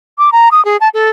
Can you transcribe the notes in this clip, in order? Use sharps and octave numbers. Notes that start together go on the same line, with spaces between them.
D6
A#5
D#6
G#4
A5
A4